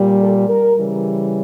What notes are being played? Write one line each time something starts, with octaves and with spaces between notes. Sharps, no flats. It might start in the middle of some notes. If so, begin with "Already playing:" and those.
Already playing: A#2 G3
A4
A#4
C#3 E3 G3